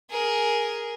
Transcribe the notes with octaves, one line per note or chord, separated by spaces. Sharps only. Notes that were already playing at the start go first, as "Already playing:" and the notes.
G#4 A#4